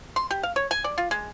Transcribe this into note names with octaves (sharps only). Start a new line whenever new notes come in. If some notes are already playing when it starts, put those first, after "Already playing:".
C6
G4
F5
C#5
G#5
D5
F4
G#3